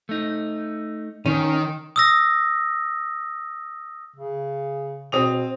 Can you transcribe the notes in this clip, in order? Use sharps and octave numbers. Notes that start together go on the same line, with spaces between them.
A3 D#4
D#3 C#4
D#6 E6 A#6
C#3
B2 C4 D#6 F7